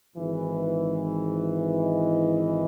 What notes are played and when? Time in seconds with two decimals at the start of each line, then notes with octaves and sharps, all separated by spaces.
0.16 G#1 G#2 E3
1.81 D#5